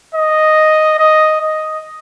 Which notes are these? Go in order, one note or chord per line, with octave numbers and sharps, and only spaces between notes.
D#5
D#5
D#5